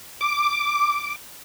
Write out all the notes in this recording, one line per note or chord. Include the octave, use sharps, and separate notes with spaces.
D6